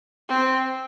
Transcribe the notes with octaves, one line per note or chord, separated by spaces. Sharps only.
C4